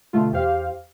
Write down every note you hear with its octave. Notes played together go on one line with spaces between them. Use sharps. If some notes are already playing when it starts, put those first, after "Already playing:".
B2 D3 A3 F4
E2 G4 C5 F5